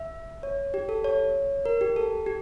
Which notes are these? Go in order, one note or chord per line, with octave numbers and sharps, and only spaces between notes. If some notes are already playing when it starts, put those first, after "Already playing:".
Already playing: E5
C#5
G4
A4
C#5
A#4
G4
A4
G4